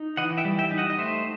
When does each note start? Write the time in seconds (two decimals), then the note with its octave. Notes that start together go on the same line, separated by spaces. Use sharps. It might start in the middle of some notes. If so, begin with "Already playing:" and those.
Already playing: D#4
0.17 E3 D#5 F#5
0.37 E5 G5
0.45 G3
0.59 E5 G5
0.71 D#4
0.78 D#5 F#5
0.90 D#5
0.98 A3 C5 E5